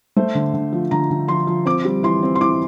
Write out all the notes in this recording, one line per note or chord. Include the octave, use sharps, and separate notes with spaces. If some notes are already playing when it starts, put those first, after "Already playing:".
A3 C5
D3
D3
F3
D3 A#5
D3
F3 C6
F3
C4 D6
G3
E3 C6
C4
C6
E3 D6